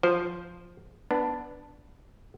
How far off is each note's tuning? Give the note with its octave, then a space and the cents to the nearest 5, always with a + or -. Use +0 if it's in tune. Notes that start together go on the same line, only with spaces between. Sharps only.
F3 +0 C5 +0
B3 +0 D4 +0